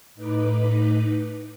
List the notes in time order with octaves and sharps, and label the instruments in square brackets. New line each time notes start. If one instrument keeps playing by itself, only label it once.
[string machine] A2 D#4 B4 D6